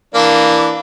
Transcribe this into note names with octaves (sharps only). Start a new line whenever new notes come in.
E3 A#3 D4